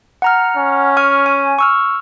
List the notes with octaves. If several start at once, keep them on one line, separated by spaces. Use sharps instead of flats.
F#5 A#5 F6
C#4
G#5 C#6 F6
G#5
C#6 E6 F6